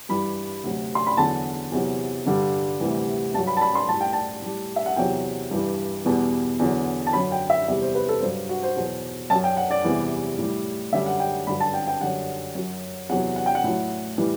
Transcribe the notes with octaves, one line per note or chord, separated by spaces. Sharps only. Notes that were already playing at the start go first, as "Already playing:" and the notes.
G2 E3 G3 B5
D2 C3 F#3
C6
B5
E2 D3 F#3 A5
E2 C3 F#3
G2 D3 G3
D2 C3 E3 G3
G2 F#3 A5
B5
A5
B5
C6
A2 G3 A5
G5
A5
A2 G3
E5
F#5
E2 C3 F#3 G5
G2 E3 G3
E2 B2 G3
E2 D3 F#3
A5
F#2 D3 F#3 B5
G5
E5
E2 C3 G3 E5
C5
B4
A4
G2 F#3 C5
F#4
C5
E2 B2 F#3
F#2 F#3 A5
G5
F#5
D5
E2 C3 E3 G3
A2 G3
F#2 D3 G3 E5
F#5
G5
G2 D3 F#3 B5
A5
G5
G5
F#2 D3 G3 F#5
F#2 F#3
E2 C3 F#3 F#5
F#5
G5
F#5
A2 F#3
A2 E3 G3